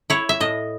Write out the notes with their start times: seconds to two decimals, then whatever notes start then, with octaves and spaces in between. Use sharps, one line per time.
0.10 E4 C#5
0.29 E5
0.40 A2 D#5